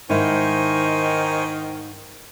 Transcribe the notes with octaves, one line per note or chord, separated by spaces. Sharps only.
G#2 D#3 E4 C5 G#5 C#6